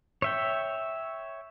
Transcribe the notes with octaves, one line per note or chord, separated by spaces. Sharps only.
C#5 E5 G5